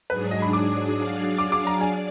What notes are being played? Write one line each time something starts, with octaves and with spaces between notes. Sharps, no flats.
G#2 F#3 D4 G#4 B4
D#5
B5
D6
F#3 D4 G#4 D5 F5
D6
D6
A#5
D5 G#5